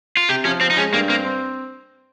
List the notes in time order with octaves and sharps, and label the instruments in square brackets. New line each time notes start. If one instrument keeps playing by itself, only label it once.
[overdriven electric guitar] F4
[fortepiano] C3 [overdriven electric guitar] G4
[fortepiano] F3 [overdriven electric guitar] C#4
[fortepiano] F3 [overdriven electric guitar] C4
[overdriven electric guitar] D#4
[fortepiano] G#3 [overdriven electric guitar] C#4
[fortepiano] G2 [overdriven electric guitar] A#3
[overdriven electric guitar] A#3 [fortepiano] C4
[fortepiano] C4